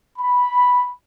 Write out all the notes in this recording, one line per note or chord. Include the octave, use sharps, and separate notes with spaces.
B5